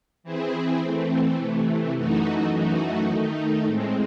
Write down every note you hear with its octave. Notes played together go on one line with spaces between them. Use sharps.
E3 C4 E4 G#4
E3 A3 C4
C3 E3 A3
F#2 E3 A3 D#4 F#4
F#2 E3 A3 D#4 F#4
D#3 A3 D#4
A2 G#3 C4